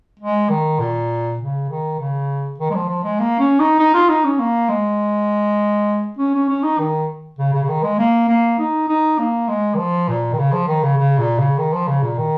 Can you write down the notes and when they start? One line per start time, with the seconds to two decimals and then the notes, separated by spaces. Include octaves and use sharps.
0.20 G#3
0.49 D#3
0.79 A#2
1.39 C#3
1.69 D#3
1.99 C#3
2.59 D#3
2.70 G#3
2.74 F3
2.89 F3
3.04 G#3
3.19 A#3
3.39 C#4
3.59 D#4
3.79 D#4
3.94 F4
4.09 D#4
4.24 C#4
4.39 A#3
4.69 G#3
6.18 C#4
6.34 C#4
6.49 C#4
6.63 D#4
6.79 D#3
7.39 C#3
7.53 C#3
7.63 C#3
7.68 D#3
7.83 G#3
7.99 A#3
8.28 A#3
8.59 D#4
8.88 D#4
9.19 A#3
9.48 G#3
9.74 D#3
9.78 F3
10.08 A#2
10.32 D#3
10.38 C#3
10.53 F3
10.68 D#3
10.83 C#3
10.98 C#3
11.18 A#2
11.38 C#3
11.58 D#3
11.73 F3
11.88 C#3
12.03 A#2
12.18 D#3